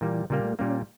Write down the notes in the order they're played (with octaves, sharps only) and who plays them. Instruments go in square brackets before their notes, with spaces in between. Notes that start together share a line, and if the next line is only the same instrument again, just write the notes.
[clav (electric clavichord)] A#2 G3 A#3 [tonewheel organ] E3
[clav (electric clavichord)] A#2 G3 A#3 [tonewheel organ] C#3
[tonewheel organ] A3
[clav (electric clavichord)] A#2 G3 A#3 [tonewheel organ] C#4